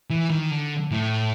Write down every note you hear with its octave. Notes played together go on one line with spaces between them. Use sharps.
E3
D#3
D3
A2